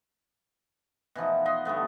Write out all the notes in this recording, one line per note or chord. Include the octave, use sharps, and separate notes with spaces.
B2 E3 F3 D#4
D#5 F#5 B5 C6
D3 G3 A3 B3